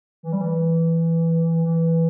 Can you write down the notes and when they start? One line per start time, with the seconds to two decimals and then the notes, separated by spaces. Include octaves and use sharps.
0.23 E3
0.32 G3
0.41 E3
1.64 E3